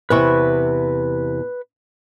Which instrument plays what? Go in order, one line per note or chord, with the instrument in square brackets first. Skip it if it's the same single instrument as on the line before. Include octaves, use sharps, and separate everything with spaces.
[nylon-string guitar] E2 C3 E4 [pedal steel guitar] B4 C#6